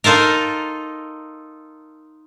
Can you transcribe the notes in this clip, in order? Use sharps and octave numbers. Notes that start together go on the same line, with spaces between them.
D#4 F4 A4 A#4